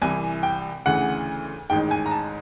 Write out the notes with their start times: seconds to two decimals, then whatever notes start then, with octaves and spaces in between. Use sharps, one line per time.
0.02 C2 C3 E3 G#5
0.43 G5
0.86 D2 C#3 E3 F#5
1.70 A1 G#2 D#3 G5
1.91 G#5
2.06 A#5
2.11 A5